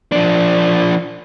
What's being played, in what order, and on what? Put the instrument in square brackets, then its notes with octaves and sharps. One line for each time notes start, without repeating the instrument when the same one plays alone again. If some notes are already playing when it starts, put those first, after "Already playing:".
[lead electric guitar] F3 D4